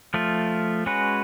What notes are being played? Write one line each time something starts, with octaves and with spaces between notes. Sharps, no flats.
F3 A3 F4
G#3 C#4 F#4 B4